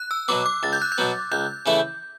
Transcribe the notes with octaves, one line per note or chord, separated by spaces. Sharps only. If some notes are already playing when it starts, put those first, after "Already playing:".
Already playing: F#6
E6
B2 F#3 B3 D6
D6
C#2 A6
G6
F#6
G6
B2 F#3 B3
C#2 G6
C#3 E3 A3 E4